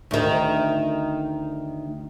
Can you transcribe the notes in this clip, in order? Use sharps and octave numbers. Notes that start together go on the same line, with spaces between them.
D2 D#3